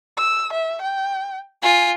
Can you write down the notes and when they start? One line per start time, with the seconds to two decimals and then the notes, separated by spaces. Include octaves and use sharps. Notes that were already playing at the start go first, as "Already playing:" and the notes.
0.17 E6
0.53 E5
0.82 G5
1.62 F4 G#5